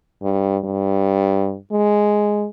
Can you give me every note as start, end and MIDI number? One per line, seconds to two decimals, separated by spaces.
0.23 0.58 43
0.65 1.57 43
1.72 2.47 56